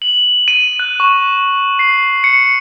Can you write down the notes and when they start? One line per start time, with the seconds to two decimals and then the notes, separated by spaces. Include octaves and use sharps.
0.02 F#7
0.48 D#7
0.79 F#6
1.00 C#6
1.79 C7
2.24 C#7